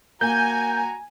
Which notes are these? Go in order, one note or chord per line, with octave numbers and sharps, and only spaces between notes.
A#3 F#4 G#5 A#5 G6